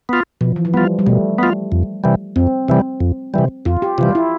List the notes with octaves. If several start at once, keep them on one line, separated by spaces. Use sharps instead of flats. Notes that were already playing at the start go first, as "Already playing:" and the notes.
B3 F4
B2 F3
E3
F3
G3 B3 F4
G3
B2 A3
B3 F4
F2
C3 E3 G3
F2 C4
C3 E3 G3
F2
C3 E3 G3
F2 F4
G4
C3 E3 G3 F4
E4